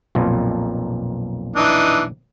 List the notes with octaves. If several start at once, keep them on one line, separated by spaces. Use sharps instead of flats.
B1 F2 A#2
E3 D4 D#4